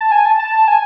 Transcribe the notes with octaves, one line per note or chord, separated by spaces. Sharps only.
A5
G#5
A5
A5
A5
G#5